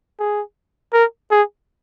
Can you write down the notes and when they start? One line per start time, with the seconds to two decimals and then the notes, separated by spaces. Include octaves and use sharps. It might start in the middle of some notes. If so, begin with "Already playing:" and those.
0.19 G#4
0.93 A#4
1.31 G#4